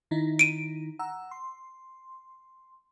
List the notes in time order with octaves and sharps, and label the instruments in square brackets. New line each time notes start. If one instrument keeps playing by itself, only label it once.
[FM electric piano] D#3 D#4 E4
[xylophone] D7 D#7
[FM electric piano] F#5 A#5 E6
C6